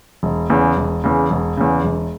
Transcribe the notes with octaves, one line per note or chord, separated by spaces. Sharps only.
E1
E2 C#3
E1
E2 C#3
E1
E2 C#3
E1